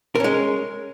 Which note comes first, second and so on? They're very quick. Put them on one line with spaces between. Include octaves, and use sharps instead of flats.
A#4 C#4 G#3